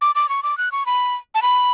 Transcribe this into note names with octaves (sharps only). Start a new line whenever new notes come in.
D6
D6
C#6
D6
F#6
C#6
B5
A5
B5